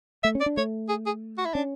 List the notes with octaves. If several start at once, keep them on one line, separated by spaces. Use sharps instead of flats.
A3 E5
C#4
D5
D4
A3 C#5
G#4
G#4
F#4
E4
C#4 D4